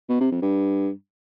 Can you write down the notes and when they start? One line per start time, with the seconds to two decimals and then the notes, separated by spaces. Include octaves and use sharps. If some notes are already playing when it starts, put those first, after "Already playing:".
0.09 B2
0.20 C3
0.31 F2
0.42 G2